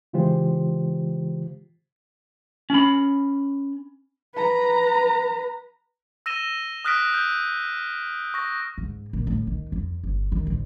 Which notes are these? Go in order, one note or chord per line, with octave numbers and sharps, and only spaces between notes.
C#3 E3 G#3 F4 G4 C5
C#4 B5
B4 A#5
E6 A#6 D#7 E7 G7
D#6 F6 F#6 A#6 B6 D7
F6 G6
C#6 A#6
G#2
A#2
A2
D#3
F2
G1
D#3
A1